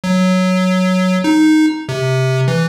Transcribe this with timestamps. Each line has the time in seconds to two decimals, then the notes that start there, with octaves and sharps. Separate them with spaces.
0.04 F#3
1.24 D#4
1.89 C3
2.48 E3